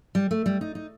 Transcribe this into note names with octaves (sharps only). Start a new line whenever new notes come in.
G3
A3
G3
D#4
D#4